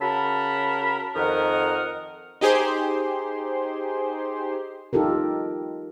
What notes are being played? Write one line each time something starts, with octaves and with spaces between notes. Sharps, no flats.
C#3 F#4 A#4 A5 B5
F2 D#3 A#4 D#5 F#5 F6
D#4 G4 G#4 C5 C6
D#4 F4 G4 A4 A#4